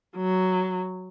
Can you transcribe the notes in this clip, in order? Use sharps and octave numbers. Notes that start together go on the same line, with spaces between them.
F#3